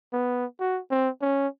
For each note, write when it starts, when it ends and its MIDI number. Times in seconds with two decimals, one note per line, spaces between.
0.13 0.45 59
0.60 0.80 66
0.91 1.10 60
1.21 1.48 61